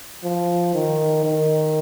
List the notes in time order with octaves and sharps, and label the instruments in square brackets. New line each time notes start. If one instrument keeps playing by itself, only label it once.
[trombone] F3
D#3
D#3